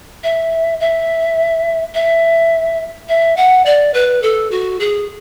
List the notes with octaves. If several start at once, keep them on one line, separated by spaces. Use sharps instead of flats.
E5
E5
E5
E5
F#5
D5
B4
A4
F#4
G#4